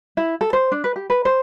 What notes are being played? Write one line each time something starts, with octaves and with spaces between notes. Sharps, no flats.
E4
A4
C5
D4
B4
G4
B4
C5